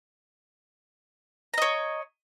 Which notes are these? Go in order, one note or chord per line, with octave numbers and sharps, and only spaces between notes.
C#5 D#5 A#5